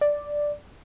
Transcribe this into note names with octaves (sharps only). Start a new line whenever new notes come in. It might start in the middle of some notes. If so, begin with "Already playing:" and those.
D5